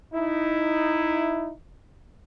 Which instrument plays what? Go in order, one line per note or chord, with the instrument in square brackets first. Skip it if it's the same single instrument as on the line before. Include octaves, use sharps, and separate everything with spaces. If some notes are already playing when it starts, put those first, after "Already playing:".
[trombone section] D#4 E4